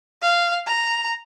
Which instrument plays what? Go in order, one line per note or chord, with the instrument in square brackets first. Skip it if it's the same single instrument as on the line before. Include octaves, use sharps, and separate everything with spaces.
[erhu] F5
A#5